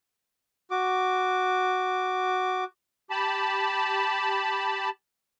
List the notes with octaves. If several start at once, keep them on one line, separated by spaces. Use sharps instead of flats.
F#4 D6
G4 A5 B5